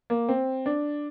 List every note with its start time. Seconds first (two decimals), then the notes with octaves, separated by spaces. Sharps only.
0.10 A#3
0.29 C4
0.66 D4